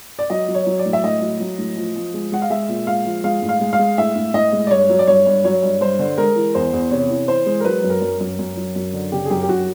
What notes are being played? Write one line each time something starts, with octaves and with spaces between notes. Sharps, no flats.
D5
F#3 D#5
F#3
C#5
F#3
D5
A2
E5
A2 D#5
F#3
F#3
A2
F3
F3
G#3
G#3 F#5
F5
G#3 E5
A#2
G#3 F5
F3
G#3 F5
A2
F5
G#3
F5
G#3
A2 E5
A2
A2 D#5
G#3
D5
G2 C#5
F#3
D5
G2 C#5
G2
F#3 C#5
G2
G2 C5
D3
G#3 A#4
E3
E2 C5
E2
C3 C#5
E3
E3 C5
G#3
A#4
F#3 B4
F#2
A#4
F#2
F#2
F#2
F#3
F#2
D3
C#3 G4
G#4
F#2 G4
G4
F#2 F#4